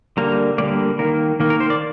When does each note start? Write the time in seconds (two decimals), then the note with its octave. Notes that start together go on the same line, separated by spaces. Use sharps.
0.17 D3 G3 A#3 A#5
0.58 D3 G3 A#3 D5
0.99 D#3 A#3 A#4
1.40 D#3 A#3
1.50 A#4
1.60 C5
1.70 D5